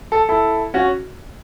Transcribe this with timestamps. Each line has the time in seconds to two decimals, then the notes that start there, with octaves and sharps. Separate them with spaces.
0.12 A4
0.29 E4 A4
0.74 C#4 F#4